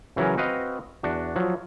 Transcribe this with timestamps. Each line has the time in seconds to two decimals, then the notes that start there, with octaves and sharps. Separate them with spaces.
0.16 C#3 E3 F#3 C#4 A#4
0.37 C4 F#4 B4 D#5 F5
1.03 E2 D4 F#4
1.36 F3 F#3